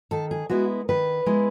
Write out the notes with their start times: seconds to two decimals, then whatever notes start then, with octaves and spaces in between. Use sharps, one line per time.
0.11 D#3 A4
0.31 G#4
0.49 G#3 B3 E4 F#4
0.89 D#3 B4
1.26 G#3 B3 E4